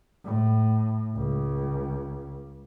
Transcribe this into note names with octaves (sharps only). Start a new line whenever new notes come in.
A2
C#2